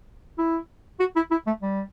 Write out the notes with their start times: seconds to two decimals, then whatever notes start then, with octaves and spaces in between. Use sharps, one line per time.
0.38 E4
1.00 F#4
1.16 E4
1.31 E4
1.47 A3
1.62 G3